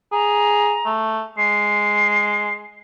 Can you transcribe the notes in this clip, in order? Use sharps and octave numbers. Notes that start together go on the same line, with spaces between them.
G#4 A#5
A3
G#3 C7